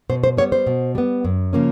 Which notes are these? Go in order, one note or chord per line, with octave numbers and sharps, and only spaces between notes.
B2 C5
C5
G3 B3 C#5
C5
B2
G3 B3
F#2
C#3 F3 A#3 C#4